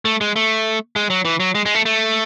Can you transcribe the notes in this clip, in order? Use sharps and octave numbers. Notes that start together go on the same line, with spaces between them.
A3
G#3
A3
G#3
F#3
E3
F#3
G#3
G#3
A3
A3